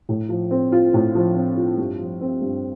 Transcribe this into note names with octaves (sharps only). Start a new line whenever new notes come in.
A2
F3
C4
F4
A2
F3
C4
F4
G2
F3
C4
G2